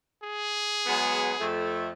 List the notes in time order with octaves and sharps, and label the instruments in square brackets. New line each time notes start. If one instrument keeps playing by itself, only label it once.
[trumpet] G#4
[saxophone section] F#3 G#3 B3
F2 A3